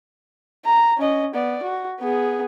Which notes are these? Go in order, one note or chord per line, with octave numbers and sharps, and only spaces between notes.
A#5
C#4 D#5
B3 D5
F#4
B3 G#4